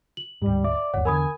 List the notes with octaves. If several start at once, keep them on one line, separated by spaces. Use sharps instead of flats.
F#7
D1 G#2 G3
D5 E5
G1 D#2 C#5 F#5
E2 D3 A#4 G#5 B5 D#6